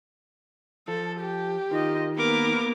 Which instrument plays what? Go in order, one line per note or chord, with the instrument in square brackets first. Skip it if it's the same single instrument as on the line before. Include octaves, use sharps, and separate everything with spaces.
[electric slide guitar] F3 [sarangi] A4
[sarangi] G4
[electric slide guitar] D#3 [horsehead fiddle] F4 D#5
[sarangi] A#3 [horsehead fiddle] B3 B4 [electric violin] A#4 D6